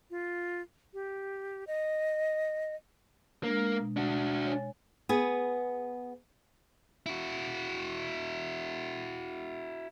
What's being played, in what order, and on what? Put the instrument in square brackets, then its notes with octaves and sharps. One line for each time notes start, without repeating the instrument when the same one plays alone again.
[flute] F4
G4
D#5
[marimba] G#3 D4 [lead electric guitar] A#3
[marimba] B2
[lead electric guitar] D4 F#4
[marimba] C#5 G#5
[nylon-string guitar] B3 G#4
[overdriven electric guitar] E4 F#4